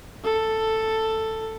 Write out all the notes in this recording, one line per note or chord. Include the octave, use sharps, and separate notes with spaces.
A4